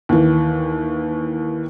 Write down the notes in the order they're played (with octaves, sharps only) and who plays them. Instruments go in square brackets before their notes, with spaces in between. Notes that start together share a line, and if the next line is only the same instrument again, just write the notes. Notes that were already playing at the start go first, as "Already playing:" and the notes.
[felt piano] D#2 E3